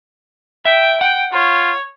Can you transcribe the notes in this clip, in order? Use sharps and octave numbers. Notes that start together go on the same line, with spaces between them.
E5 G5
F#5 G5
F4 C#5